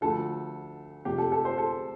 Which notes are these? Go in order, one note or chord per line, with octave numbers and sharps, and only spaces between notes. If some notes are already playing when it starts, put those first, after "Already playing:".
D2 D3 F3 A4
F1 F2 C3 G4
A4
A4
C5
A4